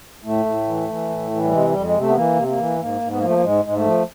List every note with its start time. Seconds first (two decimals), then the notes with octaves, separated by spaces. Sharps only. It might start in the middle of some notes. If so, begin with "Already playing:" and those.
0.24 A2 A3
0.45 A2
0.68 E3
0.89 E3
1.09 A2
1.31 E3
1.44 G3
1.52 C3 G#3
1.68 F2 G3
1.84 G#3
1.94 C3
2.00 A3
2.08 B3
2.15 E3 A#3
2.36 C3
2.48 A#3
2.58 E3
2.80 G#2 A#3
3.01 G#2
3.11 B3
3.19 A#3
3.22 F3 A3
3.33 A#3
3.43 G#2 G#3
3.64 G#2 G#3
3.75 A3
3.86 F3